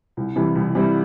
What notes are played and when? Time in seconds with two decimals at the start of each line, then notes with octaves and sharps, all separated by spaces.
0.17 C2
0.36 C3 E3 G3
0.55 C2
0.75 C3 E3 G3